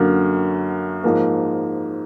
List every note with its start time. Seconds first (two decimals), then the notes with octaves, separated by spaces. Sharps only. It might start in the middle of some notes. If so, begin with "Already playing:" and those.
Already playing: F#2 D3 F#3 A#3
1.04 G#2 F3 A#3